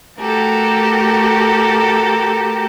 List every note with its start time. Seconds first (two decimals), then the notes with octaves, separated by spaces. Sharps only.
0.17 A3 F#4 G4 A4 A#4